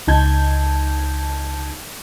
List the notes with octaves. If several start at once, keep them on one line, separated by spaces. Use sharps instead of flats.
C#2 D#4 A5 G6 G#6